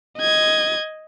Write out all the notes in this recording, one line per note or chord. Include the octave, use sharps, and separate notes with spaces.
D#5 G#6